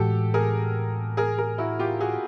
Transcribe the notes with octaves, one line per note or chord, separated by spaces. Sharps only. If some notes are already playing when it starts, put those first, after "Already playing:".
Already playing: A2 E3 G#3 F#4 G4 A4
G#4 A#4
G#4 A#4
G#4 A#4
E4 F#4
F4 G4
F#4 G#4